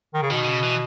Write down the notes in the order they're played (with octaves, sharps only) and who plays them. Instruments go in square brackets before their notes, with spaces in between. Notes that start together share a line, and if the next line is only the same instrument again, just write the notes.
[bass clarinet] D#3
C#3
[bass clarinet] B2 [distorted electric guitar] D#3
[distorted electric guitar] D#3
C#3
E3